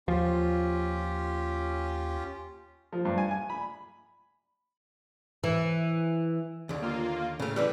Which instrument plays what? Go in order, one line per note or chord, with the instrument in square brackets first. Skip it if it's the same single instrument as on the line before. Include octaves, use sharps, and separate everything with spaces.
[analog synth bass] D#2 [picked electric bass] F3 [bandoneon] C#4 F4 G4
[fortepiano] F3
G2
G#5
G#5
B5
[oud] E3
[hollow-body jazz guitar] D#2 D3
[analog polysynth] A#3 F4
[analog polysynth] A2 F6 [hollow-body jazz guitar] C#3 A3
[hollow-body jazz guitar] D3 E3 G3 [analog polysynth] B4